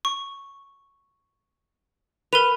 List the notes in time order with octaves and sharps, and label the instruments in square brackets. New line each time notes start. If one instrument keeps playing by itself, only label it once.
[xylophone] C#6
[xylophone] A#4 D#7 F7 [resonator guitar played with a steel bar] B4